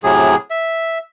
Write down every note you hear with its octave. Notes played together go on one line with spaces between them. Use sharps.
A2 C3 F#3 G#4
E5